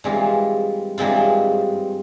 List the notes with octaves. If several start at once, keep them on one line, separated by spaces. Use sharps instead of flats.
G2 E3 G#3 C4 F4
G2 E3 G#3 C4 F4